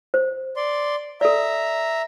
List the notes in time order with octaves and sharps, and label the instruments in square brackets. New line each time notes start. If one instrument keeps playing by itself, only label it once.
[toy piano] C5
[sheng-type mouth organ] D5 C6
[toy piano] A4 D5 [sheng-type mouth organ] E5 A#5